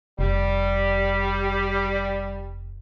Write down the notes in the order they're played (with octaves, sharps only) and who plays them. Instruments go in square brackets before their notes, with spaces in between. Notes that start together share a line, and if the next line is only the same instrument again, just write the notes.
[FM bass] F1 [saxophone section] G3